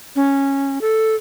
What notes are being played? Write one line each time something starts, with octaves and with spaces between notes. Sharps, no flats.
C#4
A4